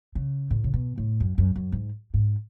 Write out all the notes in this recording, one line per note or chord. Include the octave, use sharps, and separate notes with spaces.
C#3
A2
C#3
B2
A2
F#2
F#2
F#2
G#2
G#2